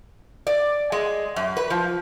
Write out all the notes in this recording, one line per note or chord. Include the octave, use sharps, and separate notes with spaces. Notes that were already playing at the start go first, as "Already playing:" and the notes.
D5
G#3
F#2
B4
F3